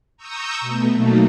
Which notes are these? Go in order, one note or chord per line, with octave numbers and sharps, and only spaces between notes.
A#5 C#6 D#6 E6 G6
B2 A3
F#3 A3 A#3 D#4